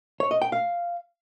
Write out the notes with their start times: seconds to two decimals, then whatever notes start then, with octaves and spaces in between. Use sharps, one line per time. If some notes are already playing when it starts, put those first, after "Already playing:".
0.20 C#5
0.31 D#5
0.42 G5
0.52 F5